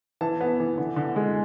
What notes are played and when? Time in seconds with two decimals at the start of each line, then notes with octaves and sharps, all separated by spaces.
0.21 E3 A5
0.41 B3
0.60 E3
0.78 D3
0.96 D3
1.16 G#3